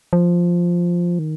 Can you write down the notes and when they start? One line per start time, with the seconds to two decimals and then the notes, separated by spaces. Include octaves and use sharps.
0.13 F3
1.19 D#3